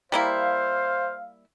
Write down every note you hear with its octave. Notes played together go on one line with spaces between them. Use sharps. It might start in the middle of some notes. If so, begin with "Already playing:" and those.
G3 A#3 E4 C5 F5